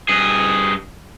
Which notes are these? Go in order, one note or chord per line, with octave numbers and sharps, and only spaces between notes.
G2 G#4